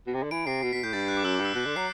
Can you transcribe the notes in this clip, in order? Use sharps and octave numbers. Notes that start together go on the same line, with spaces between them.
B2
C3
D3
E3 D7
C3 C7
B2 C7
B2 B6
A2 G6
G2 A6
F#6
D6
F#2 E6
D6
G2
E6
B2 F#6
D3
F#3 C7